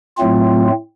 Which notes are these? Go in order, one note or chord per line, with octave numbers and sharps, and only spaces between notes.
A2 F#3 A3 C4 F4